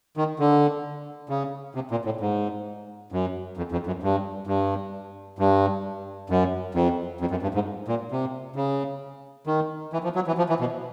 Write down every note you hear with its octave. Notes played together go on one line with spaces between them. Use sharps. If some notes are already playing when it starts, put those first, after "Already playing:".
D#3
D3
C#3
C3
A#2
A2
G#2
F#2
F2
F2
F#2
G2
G2
G2
F#2
F2
F2
F#2
G2
G#2
A#2
C3
C#3
D#3
E3
F3
F#3
E3
F3
E3
B2